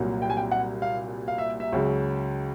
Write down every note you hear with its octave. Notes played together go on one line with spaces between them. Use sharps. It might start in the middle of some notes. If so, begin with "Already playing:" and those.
Already playing: C2 A#2 F#3
G5
G#5
G5
F#5
F5
F5
E5
E5
C#2 C#3 F#3